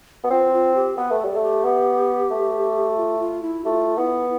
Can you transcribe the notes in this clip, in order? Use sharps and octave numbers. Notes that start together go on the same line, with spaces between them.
B3
C4 F4
F4
G4
B3 B4
A3
A4
G3
A4
A3
G4
B3
A3
F4
F4
E4
A3 F4 G4
B3 E4